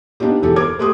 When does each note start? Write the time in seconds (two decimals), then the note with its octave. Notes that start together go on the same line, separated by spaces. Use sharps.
0.20 B3 D4 D#4 F4 G4
0.42 E1 E3 G4 A4
0.56 A#4 C5 D6 G#6
0.79 A3 G4 C6 D#6